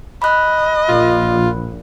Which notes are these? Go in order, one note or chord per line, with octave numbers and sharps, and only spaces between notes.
D#5 B5 F#6
A#1 F4